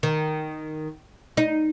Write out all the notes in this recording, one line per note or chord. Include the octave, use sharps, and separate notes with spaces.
D#3
D#4